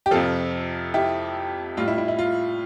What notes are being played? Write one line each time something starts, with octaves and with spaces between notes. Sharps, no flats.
G4
F2 C3 F3 F4 A4
E4 G4
A2 G3 F4
E4
E4
E4
F4